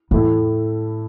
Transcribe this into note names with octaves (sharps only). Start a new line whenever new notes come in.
E2 A2 A3 E4